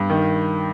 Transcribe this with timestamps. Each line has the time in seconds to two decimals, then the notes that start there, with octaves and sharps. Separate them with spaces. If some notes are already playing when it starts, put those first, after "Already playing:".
Already playing: G2
0.10 D#3